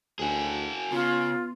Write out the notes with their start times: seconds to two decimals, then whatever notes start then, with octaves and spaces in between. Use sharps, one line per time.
0.19 D2 F#4 G#4
0.92 C#3 B3 F4